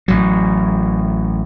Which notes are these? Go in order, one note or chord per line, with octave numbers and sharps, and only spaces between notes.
A1 F#3